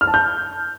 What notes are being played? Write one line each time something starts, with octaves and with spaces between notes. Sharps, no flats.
F6
A5
G6